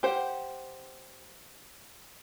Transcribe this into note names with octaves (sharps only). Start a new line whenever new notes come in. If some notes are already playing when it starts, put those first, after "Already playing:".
G4 C5 F#5 G5